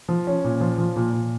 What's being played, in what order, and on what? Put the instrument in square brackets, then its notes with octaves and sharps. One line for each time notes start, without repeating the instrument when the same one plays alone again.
[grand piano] F3
C#4
A#2
F3
F3
A#2
A#2